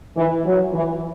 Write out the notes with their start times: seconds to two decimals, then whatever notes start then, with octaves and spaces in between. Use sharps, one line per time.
0.16 E3
0.45 F#3
0.73 E3